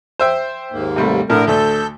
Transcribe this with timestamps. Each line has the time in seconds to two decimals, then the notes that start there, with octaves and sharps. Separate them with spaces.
0.19 C5 E5 G5
0.72 D#2 G#2 A#3
0.96 C3 G3 A3
1.30 A2 D3 A#4
1.47 D2 A3 A4 G6